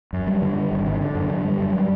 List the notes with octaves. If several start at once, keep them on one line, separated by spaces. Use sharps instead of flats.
F#2
G3
D3
G3
G#1
D3
D3
F#2
D3
G3
F#2
G3